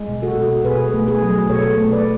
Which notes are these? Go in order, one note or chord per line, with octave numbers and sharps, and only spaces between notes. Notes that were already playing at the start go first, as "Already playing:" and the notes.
Already playing: G#3
B2
F#4 A4
B2
B2 G#4 B4
A3
G#4 B4
F#3
B2 A4 C#5
A3
B4 D5